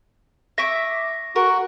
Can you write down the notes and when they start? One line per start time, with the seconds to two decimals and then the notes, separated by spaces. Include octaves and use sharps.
0.58 E5 C#6 D6 A#6
1.36 F#4 A#4